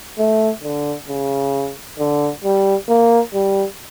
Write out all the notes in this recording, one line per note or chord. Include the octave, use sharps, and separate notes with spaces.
A3
D3
C#3
D3
G3
A#3
G3